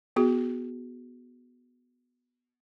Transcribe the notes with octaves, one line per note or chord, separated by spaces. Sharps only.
B3 F#4 G#4